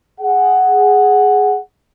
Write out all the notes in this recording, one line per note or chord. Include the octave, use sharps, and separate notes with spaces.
G#4 F#5